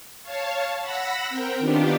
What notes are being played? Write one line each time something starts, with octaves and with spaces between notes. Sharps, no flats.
C#5 F5 A5
F#5 B5 E6 A#6
C4 A#4 G5
D#3 B3 D4 F4 G4